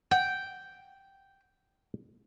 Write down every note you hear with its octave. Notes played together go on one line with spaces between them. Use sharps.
F#5 G5